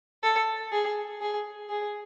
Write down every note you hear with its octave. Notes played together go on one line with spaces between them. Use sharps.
A4
G#4
G#4
G#4